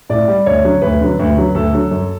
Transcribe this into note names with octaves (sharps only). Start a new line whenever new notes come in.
A2 D5
G3
D2 C#5
D3 F#3
D2 B4
D3 F#3
D2
D3 F#3
D2 A4
D3 F#3
F#2